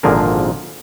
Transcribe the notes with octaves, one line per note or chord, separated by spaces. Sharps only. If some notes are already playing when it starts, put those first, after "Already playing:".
G#1 A#2 D3 F3 G#4 A#4